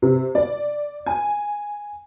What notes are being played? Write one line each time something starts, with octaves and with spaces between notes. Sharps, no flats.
C3
D5
G#5